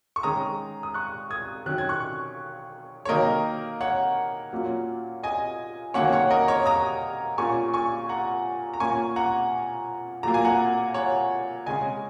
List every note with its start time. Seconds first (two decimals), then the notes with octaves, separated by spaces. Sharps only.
0.16 C#6
0.23 D#3 G#3 C#4 A#5 D#6
0.83 D#6
0.94 C#6 F#6
1.31 D#6 G#6
1.66 D#3 F#3 C#4 F#6
1.78 G#6
1.89 C#6 F#6
3.05 C#5
3.09 D#3 F#3 A#3 A#4 D#5
3.81 C#5 F#5
4.53 A#2 F#3 A#3 C#4
5.23 D#5 G#5
5.94 D#3 F#3 A#3 C#4 C#5 F#5
6.13 C#5 F#5
6.31 A#4 D#5
6.48 C#5
6.66 A#5 D#6
7.38 A#2 A#3 C#4 G#5 C#6
7.74 G#5 C#6
8.09 F#5 A#5
8.74 A#5
8.80 A#2 A#3 C#4 G#5 C#6
9.16 F#5 A#5
10.23 A#2 F#3 A#3 A#5
10.34 G#5
10.45 F#5 A#5
10.94 C#5 F#5
11.66 C#3 G#3 C#4 D#5 G#5